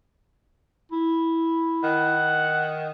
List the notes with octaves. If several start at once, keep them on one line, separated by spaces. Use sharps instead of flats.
E4
D#3 F#5